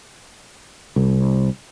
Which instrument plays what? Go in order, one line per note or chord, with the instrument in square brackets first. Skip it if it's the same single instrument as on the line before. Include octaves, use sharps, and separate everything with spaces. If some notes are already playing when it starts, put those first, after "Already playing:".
[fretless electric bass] C2